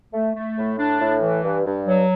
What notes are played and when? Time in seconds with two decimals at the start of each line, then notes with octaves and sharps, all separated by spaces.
0.13 A3
0.35 A3
0.58 A2
0.78 D4
1.00 A2
1.22 E3
1.44 G2
1.65 G2
1.87 F#3